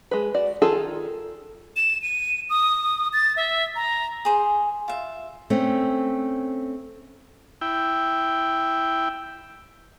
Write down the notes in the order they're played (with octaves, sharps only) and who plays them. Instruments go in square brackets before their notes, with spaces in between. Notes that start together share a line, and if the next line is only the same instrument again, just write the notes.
[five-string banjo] G#3 B4
F#4 D5
D#3 F4 G#4 A4
[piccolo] E7
D#7
D#6
A6
E5
A#5
[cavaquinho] G#4 C5
F4 E5
[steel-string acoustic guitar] A3 C4 C#4
[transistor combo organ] E4 G5